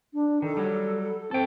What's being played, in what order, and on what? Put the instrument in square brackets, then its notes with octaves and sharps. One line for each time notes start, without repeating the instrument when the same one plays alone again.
[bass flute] D4
[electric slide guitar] D#3 [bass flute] A4
[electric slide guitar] F#3 G3
[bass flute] C4 [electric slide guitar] A4 G5